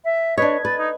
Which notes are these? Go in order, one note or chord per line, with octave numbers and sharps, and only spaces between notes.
E5
D4 B4 C#5 D#5 G#6
B4 A6
D#4